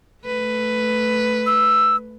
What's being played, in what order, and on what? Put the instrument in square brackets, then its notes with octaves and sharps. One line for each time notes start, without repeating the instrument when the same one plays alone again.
[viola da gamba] A3 B4
[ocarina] E6